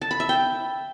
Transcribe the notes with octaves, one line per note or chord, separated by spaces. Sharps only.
A5
B5
E5
G5